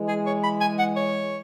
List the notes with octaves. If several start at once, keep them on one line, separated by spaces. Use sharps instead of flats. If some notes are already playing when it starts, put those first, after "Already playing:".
Already playing: E3 G#3
G#4
C#5
B5
G#5
F#5
C#5